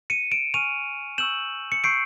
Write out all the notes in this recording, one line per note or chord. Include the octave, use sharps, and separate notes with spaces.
C#7 D#7
D7 E7
G#5 C#6 F6 D#7 F7
C#6 E6 G6 E7 F#7
C#7
C#6 E6 G6 C7 D7